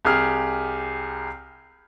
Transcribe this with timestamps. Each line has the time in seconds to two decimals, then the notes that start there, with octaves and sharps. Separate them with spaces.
0.05 C2 G4 G#4 F6